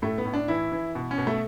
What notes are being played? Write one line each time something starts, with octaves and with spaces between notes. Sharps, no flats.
A2 A3
B3
A2
D4
E3 E4
E3
B2
C#4
B2
A3